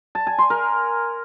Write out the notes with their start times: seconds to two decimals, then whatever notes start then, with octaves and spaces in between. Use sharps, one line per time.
0.15 A5
0.27 G#5
0.38 C6
0.50 A#4